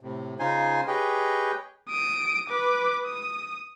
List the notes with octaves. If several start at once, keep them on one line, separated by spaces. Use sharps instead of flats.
A2 C3
C#3 D#4 F4 C5 G#5 C6
G4 G#4 B4 C#5 D#5 G5
D#6 D7
B4 D6
D#6